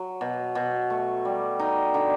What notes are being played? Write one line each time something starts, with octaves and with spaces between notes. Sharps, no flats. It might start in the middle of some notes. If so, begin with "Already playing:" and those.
Already playing: F#3
B2
B2
A3
G3
D#4
D3